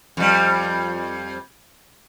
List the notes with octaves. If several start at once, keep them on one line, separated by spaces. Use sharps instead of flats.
F2 G3